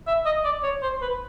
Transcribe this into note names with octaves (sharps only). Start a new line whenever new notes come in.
E5
D#5
D5
C#5
C5
B4